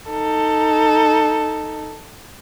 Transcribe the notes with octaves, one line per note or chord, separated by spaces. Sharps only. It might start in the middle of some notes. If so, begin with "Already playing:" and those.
D#4 A4